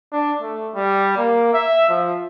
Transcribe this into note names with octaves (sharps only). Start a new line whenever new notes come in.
D4
A3
G3
A#3
E5
F3